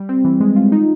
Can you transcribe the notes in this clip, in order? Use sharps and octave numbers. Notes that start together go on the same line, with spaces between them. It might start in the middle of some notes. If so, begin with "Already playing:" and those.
Already playing: G3
C4
E3
G#3
F4
D#4